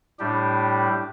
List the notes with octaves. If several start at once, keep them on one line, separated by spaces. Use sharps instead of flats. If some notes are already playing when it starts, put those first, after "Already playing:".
A2 G3 D4 G4